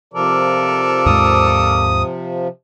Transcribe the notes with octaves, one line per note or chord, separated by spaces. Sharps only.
C3 F3 A4 A#4 D5
D#2 G#2 G#3 D#6